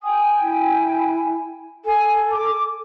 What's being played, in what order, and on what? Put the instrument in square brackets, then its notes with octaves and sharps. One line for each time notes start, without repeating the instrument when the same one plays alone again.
[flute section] G5 G#5 [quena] D#6
[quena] E4
[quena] A4 [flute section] G#5
[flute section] D6